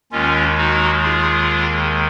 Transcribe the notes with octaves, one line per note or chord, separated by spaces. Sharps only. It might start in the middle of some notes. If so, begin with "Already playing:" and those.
D#2 D#3 G#3 C#4 F4
D#4 F#4
F4 G#4